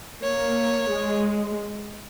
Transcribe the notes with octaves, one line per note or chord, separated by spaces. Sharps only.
A#3 C#5
G#3